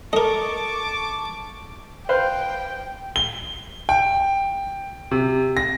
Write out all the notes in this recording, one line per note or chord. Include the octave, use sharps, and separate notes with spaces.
A4 A#4 D#5 A5 C#6 D6
B4 C5 F5 G5
G7
G5
C3
A#6